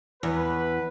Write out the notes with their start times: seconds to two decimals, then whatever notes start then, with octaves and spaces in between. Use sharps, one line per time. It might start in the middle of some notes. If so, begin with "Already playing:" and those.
0.23 E2 B4